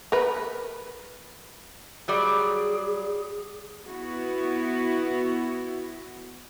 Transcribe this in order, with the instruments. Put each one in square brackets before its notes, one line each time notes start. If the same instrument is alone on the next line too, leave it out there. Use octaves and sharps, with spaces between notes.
[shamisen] A#4 B4
[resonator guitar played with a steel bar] F#3 G3 D5 [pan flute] G#4
[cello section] B3 E4 F#4